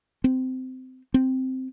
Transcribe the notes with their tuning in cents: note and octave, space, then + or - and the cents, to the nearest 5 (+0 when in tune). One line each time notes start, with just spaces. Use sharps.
C4 -20
C4 -5